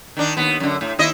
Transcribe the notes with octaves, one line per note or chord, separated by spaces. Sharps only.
D#3 D4
D#2 B3
F#2 D3
A2
D#2 E4 D#5